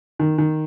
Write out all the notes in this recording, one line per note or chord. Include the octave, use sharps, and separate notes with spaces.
D#3
D#3